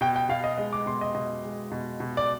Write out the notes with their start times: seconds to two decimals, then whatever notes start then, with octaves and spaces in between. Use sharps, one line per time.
0.01 B2 G5
0.16 G5
0.29 B2 F5
0.44 D#5
0.58 G#3 D#5
0.73 D6
0.86 B2 C6
1.01 D#5
1.15 B2 D#5
1.44 G#3
1.72 B2
2.00 B2
2.17 D5